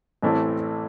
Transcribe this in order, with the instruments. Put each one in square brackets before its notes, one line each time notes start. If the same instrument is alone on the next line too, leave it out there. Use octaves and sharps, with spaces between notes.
[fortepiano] A1 A2 E3 A3 C4